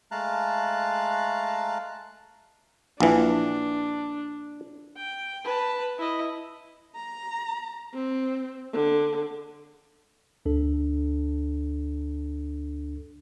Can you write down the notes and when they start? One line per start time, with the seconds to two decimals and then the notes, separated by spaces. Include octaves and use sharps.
0.11 G#3 A3 F5 A5 A#5 F#6
3.00 A#1 E3 D4
4.96 G5
5.44 B4 A5
5.98 E4 D#5
6.95 A#5
7.94 C4
8.73 D3
10.46 D2 D4 A4